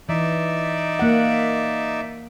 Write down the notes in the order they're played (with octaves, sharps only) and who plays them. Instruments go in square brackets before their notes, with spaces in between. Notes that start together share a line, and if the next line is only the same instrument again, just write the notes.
[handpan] E3 [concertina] D#4 D5 E5
[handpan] A#3 F#5